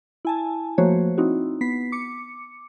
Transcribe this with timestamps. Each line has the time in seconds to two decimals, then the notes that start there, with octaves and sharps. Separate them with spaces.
0.25 E4 G#5 A5
0.78 F3 A3 A#3 F#4 C5 C#5
1.18 C4 D#4 E4 F#4
1.61 B3 B6 C7
1.92 D6 C#7